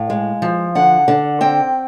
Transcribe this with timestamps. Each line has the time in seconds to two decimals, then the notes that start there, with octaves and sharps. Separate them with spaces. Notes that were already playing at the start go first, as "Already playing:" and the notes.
Already playing: A2 F5
0.10 G#3
0.42 F3
0.75 D3 F#5
1.08 D3
1.41 C4 G5